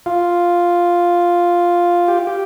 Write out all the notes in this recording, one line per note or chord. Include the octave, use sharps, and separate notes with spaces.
F4
G4
G4